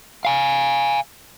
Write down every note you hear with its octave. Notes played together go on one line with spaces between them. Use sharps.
F5 G#5